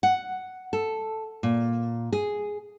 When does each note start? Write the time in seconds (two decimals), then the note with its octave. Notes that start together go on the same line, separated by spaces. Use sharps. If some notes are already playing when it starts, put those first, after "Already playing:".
0.03 F#5
0.73 A4
1.43 A#2
2.13 G#4